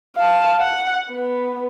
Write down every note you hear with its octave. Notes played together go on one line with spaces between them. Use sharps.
F5 A5
F#5
B3